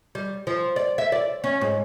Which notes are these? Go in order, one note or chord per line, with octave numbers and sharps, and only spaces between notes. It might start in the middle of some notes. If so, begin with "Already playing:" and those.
G3
F3
D5
E5
D5
C#4
G#2